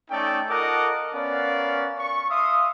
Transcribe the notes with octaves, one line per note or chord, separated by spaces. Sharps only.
A3 C#4 D#4 A4 D5 G5
F4 A4 A#4 D#5 F#5 D6
B3 C#4 A#4 D5 F5
C#6
E5 F5 C6 D#6